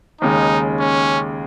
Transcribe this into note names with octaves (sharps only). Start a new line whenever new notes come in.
D#2 C#3 G#3 D#4
C#4